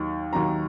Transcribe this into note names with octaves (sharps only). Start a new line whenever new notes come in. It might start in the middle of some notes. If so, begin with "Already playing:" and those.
Already playing: D#2 D#3 F#3
D#2 D#3 F#3 A#5